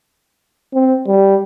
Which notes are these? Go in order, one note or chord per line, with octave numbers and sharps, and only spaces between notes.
C4
G3